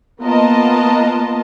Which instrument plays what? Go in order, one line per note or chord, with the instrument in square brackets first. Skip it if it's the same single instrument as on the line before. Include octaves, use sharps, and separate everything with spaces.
[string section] A#3 B3 F4 A#4 D#5 A5